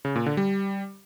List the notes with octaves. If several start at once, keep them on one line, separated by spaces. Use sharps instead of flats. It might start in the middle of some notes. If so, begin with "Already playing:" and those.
C#3
A#2
D3
G3